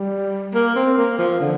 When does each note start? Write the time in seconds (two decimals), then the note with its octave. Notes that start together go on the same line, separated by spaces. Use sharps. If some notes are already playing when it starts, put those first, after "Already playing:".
Already playing: G3
0.54 A#3
0.76 C4
0.97 A#3
1.19 F3
1.40 D3